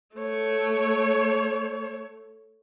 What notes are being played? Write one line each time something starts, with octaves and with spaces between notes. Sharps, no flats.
A3 C#5